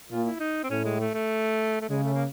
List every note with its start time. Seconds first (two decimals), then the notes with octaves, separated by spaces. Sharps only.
0.10 A#2 F4
0.25 E4
0.40 D#4
0.64 C4
0.69 A2 C#4
0.84 G#3
1.00 A3
1.14 A3
1.81 A3
1.89 C#3 G#3
2.04 A3
2.14 A#3